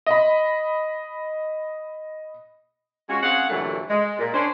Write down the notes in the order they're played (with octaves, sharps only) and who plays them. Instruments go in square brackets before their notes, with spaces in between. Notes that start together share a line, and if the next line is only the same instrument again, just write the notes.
[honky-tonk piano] D#5 B5
[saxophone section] G#3 C#4 F4 F#4
C4 C#4 G#4 F5 F#5
D2 G2 A#2 E3 F#3 A3
G#3
A#2
C#4 D4 C5